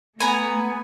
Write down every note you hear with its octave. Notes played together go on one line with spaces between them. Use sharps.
A3 B3 B4 G#5 A#5